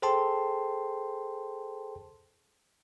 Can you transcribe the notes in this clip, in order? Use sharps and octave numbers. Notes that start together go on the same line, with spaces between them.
G#4 A4 C5 G5 A5 C6